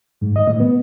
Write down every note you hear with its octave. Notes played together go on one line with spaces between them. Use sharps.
G#2
D#5
A2
B3